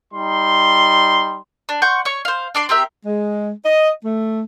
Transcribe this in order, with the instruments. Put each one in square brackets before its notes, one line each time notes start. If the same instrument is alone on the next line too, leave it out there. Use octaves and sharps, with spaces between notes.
[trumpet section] G3 D#4 C6
[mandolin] D4
F#5 C6 C#6 G6
C#5 C#6
C5 F5
D4 D5 C6
C4 G4 A#4 E5
[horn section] G#3
D#5
A3